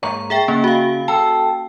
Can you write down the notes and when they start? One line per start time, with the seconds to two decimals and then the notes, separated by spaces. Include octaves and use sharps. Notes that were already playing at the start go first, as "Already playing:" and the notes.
0.03 G#2 A#3 C#5 A#5
0.30 G#4 E5 G5
0.48 C#3 A#3 C#4
0.64 F#4 F5
1.08 A4 G5